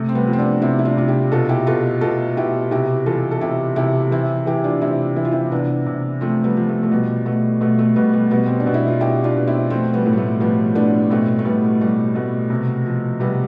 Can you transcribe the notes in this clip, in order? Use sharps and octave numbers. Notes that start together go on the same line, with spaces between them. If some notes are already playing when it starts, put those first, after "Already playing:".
Already playing: C3 A3
C4
G3 B3
F3
C4
B3 D4
C3 C4 E4
E4
D4 F4
C3 F4
E4 G4
B2 F4 A4
E4 G4
B2 F4 A4
B2 F4 A4
B2 E4 G4
C3 E4 G4
E3 F4 A4
A4
C3 E4 G4
C3 E4 G4
E3 C4 E4
E3 E4 G4
D4 F4
C3 C4 E4
E3 E4
F4
C4 E4
C3 B3 D4
C3
F3 A3 C4
G3 B3
F3
A3
A3
B2 G3
B2 A3
B2 A3
A3
B2 G3 B3
G3 B3
B2 G3 B3
C4
D4
B2
E4
F4
B2 E4 G4
D4 F4
B2
C4 E4
F3 A3 C4
G3 B3
A2
G3
A3
F3 G3 B3
A2 B3 D4
B2 A3 C4
A3
B2 G3 B3
B2 G3
B2 A3
C3
F3
C3 G3 B3